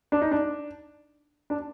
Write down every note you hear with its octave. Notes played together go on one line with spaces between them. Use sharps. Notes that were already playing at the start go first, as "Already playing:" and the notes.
D4
D#4
D4
D4